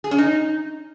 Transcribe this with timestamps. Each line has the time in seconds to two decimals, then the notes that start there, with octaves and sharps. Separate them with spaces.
0.04 G#4
0.11 C#4
0.18 D#4